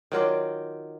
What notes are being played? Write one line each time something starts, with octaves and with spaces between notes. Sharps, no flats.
D#3 F#3 F4 D5